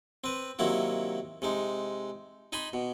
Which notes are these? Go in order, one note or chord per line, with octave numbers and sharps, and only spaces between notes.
C4 B4
C3 D#3 F#3 A#3 E4 F#4
C3 G#3 D#4
D#4 D#5 G#5 B5 C6
B2